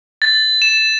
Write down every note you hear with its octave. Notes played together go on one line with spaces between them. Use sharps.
A6
E7